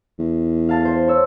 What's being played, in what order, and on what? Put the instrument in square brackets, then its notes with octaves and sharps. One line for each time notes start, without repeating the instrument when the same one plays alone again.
[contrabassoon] E2
[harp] F5 A5 F6
C5
C#5 E6